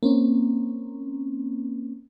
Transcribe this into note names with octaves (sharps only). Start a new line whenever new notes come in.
A#3 C4 C#4